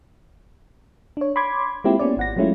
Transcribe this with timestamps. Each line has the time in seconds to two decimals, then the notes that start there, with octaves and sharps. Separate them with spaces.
1.17 D4 C#5
1.36 B5 C6 D6 G#6
1.84 G#3 A#3 C4 E4 F4 G4
1.99 A#3 B3 C#4 D5
2.17 G#1 F#5 A#6
2.36 F#3 G#3 A3 C#4 E4 F4